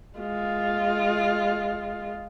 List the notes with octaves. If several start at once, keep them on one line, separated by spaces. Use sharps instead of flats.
G#3 F4